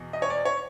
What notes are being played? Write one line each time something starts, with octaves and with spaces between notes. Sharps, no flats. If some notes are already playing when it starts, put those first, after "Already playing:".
Already playing: E2 B2
D#5
C#5
D5
C#5